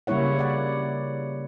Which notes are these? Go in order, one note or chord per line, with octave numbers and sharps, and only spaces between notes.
C#3 G3 A#3 E4 C#5 F#5
D5 F#5